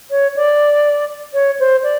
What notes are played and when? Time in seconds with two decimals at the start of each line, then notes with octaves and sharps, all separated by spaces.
0.11 C#5
0.36 D5
1.34 C#5
1.60 C5
1.83 D5